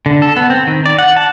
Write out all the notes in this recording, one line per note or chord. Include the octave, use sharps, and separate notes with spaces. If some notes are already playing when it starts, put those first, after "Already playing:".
D3
A4
B3
C4
D#3
D5
F#5
A5